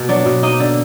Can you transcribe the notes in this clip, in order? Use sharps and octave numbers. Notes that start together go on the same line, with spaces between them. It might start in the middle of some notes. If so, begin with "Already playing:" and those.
Already playing: B2 A#3
F#3 D4 D5
B2
A#3 D#4 D#5
D3